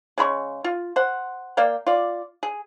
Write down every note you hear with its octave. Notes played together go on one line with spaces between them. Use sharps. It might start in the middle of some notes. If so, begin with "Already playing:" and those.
C#3 G#3 B5 C#6
F4
C5 F#5
A#3 D5 F5 G5
F4 D5
G#4